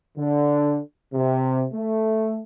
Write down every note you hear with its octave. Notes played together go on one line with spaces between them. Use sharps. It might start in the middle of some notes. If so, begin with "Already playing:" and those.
D3
C3
A3